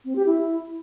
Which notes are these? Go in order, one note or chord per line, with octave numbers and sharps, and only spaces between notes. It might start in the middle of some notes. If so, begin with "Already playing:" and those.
C4
G4
E4